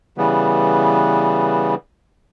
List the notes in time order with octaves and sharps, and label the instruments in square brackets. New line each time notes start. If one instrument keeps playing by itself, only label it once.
[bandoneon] C#3 E3 G3 B3